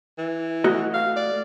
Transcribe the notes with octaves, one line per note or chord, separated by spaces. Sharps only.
E3
A3 F#4 D#5
F5
D5